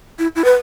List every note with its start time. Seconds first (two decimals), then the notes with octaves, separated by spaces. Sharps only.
0.19 E4
0.36 E4
0.44 B4